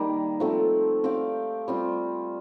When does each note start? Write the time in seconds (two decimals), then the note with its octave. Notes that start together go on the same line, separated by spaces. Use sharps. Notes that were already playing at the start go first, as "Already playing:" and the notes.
Already playing: D#3 G3 A#3 D#4
0.40 F3 A3 C4
1.04 C4 G4 D5 F5
1.68 G3 C4 F4